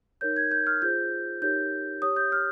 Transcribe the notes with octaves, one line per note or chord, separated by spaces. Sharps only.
D#4 A#4 C#5 G6
G#6
G6
F6
F4 G#4 C5 G6
D#4 G4 A#4 C#5 G6
G4 C#5 D#6
G6
F6